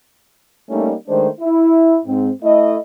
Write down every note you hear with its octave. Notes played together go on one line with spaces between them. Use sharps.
G3 A3 A#3 C#4 D#4
D#3 G#3 A3 D4 C5
E4
G#2 C4
A3 E4 D#5